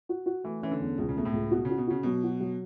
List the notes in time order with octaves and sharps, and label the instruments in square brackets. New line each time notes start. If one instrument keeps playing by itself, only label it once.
[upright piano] F#4
F#4
[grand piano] E3 [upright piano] A3
[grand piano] E3 [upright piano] C#4
[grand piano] D3
[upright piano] E2
[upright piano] C#2 [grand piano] B2
[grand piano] C#3
[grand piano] B2 [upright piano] A3
[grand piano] A2
[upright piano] C#2
[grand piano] B2 [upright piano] F#4
[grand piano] C#3
[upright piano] F#4
[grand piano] B2
[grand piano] C#3 [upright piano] F#4
[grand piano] B2 [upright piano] F#3
[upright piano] F#4
F#3